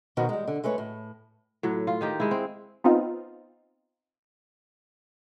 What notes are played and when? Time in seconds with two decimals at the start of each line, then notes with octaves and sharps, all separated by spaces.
0.17 B2 D#3 F3 F#4
0.29 G3 G#3
0.48 D3
0.64 G#3 A3 B4 C#5
0.78 A2
1.63 A2 F#3
1.87 F4
2.01 D#3 D#4 G4
2.20 G#3 E4
2.31 C4
2.84 B3 C4 D#4 F4